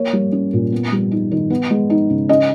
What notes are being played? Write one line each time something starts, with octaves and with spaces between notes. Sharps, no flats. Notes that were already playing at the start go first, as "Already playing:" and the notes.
Already playing: A#3 C#5
G3
C#4
A#2
B3
G3
D#4
D#3
B3
G#3
D#4
C#3
C#4 D#5